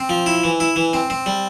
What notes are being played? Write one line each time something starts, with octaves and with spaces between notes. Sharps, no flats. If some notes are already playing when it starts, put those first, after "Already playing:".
Already playing: C4
F3
E4
E3
E4
E3
C4
C4
G3